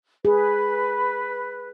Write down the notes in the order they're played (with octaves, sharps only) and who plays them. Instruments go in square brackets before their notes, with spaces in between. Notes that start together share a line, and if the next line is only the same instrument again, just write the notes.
[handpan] G#4 [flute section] B4